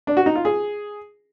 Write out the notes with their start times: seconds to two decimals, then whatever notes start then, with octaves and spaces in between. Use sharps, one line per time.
0.07 D4
0.17 F#4
0.26 D#4
0.36 F4
0.45 G#4